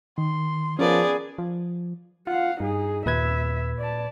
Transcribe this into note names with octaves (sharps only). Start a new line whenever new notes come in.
D#3 C6
F3 B3 C#4 G#4 A#4 D5
F3
F4 F5 F#5
G2 D#4 G#4
D#2 A#2 B4 E5 G#6
D5 A5